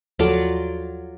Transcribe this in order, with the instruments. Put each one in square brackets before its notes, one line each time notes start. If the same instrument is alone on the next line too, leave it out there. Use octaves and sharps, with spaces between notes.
[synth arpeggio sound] D#2 F3 A4 [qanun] F#3 F4 D5